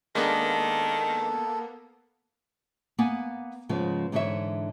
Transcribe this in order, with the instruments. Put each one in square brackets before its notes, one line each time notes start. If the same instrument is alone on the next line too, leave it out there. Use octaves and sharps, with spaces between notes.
[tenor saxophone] D#3 [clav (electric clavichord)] G#3 D4 [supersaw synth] A#3 B3 [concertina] A4
[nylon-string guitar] A#3 B3 F#5 G#5
G#2 C#3 F3 G#3 B3
G#2 D3 E3 D4 C#5 E5